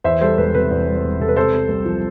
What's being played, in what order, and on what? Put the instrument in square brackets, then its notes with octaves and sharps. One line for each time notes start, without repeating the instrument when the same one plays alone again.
[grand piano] E2 C5 E5
G3 A4 C5
E1 B4
C3 B4
E2
G3
E1
C3 A4
B4
C3 A4 C5
C4
C2
F3